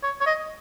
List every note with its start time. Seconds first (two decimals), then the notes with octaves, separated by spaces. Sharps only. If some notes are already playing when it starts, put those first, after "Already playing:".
0.03 C#5
0.21 C#5
0.26 D#5